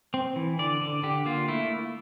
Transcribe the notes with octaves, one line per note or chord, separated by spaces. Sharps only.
C4
E3
D3 D5
D3
D3 G4
A#3 F4
A3 E4